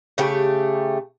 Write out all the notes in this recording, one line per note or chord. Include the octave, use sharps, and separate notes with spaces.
C#3 A3 G4